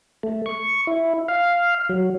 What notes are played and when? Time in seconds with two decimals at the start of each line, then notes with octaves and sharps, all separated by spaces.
0.23 A3
0.46 C#6
0.87 E4
1.28 F5
1.89 F#3